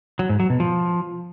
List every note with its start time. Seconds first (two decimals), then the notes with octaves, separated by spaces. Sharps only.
0.19 F#3
0.29 G#2
0.40 F#3
0.50 B2
0.60 F3